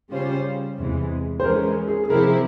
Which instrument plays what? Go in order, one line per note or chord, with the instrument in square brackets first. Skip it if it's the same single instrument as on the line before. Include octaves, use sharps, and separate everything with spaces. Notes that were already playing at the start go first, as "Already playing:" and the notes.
[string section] C#3 G3 C#4 F4 C5
E2 C3 E3 G#3
[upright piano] C5
[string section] E3 G#3 C#4 [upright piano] A#4
[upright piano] G#4
G#4
[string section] C3 F3 C4 E4 G4 [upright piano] A#4